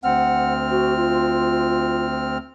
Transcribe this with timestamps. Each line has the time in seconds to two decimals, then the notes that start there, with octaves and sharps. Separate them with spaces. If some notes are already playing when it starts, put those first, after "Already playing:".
0.04 D2 C4 F#5 F6
0.70 F#4
0.97 F4